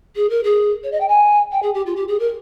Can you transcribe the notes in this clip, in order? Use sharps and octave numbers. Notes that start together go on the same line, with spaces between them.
G#4
A#4
G#4
C#5
D#5
G5
G#5
G5
G#4
G4
F4
G4
G#4
A#4